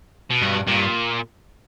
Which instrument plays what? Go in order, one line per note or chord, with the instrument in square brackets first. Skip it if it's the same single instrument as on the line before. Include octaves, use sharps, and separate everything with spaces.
[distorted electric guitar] B2
[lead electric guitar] G2
[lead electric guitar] G2 [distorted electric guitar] A#2